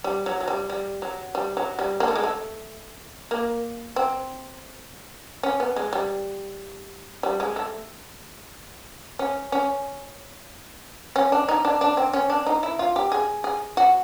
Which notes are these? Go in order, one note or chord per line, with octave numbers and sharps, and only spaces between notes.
G3
F#3
F#3
G3
G3
F#3
G3
F#3
G3
A#3
A3
G#3
A3
A#3
C4
C#4
B3
G#3
G3
G3
G#3
A3
C#4
C#4
C#4
D4
D#4
D4
D4
C4
C#4
D4
D#4
E4
F4
G4
G#4
G#4
F#4